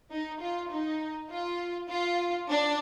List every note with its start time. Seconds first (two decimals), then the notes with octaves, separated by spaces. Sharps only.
0.11 D#4
0.41 F4
0.71 D#4
1.30 F4
1.90 F4
2.50 D4